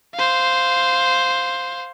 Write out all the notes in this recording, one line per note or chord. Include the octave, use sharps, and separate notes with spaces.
C5 F5